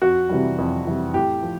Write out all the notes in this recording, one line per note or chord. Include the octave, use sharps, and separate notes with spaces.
F2 F#4
C3 E3 G3
F2
C3 E3 G3
A2 G4
F3